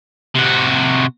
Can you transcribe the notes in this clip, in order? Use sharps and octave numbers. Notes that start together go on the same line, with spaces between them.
C3 F#4